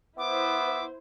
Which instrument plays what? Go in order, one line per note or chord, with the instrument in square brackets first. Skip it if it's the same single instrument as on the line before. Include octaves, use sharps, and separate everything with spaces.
[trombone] B3 [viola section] E4 C5 [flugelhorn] E5 [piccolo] D6